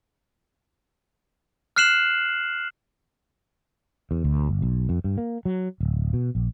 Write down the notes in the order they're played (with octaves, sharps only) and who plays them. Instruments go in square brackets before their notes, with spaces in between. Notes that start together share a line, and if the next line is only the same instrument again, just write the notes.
[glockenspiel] F6 F#6 C7 E7 F#7
[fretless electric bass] E2
D2
G1
B1
F2
G2
A#3
F#3
D1
B2
A#1